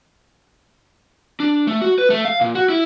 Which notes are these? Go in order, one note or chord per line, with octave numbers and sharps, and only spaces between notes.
D4
A3
F#4
B4
A3
F5
A#2
F#4
E4